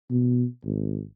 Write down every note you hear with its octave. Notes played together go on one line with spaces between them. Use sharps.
B2
G#1